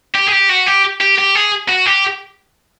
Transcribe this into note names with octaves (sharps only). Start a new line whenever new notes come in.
G4
G#4
G4
F#4
G4
G4
G4
G#4
F#4
G4